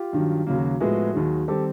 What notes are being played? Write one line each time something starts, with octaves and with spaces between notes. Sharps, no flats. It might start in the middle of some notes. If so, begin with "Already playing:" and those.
Already playing: F4 G4
G2 D#3 F#3
D#2 C#3 F#3 A#3
F#4
A2 F3 G#3 B3 F#4 G#4
D#2 D#3 F#3
D#3 G3 C4 G4 A4